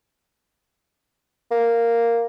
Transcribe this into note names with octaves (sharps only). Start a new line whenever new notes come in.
A#3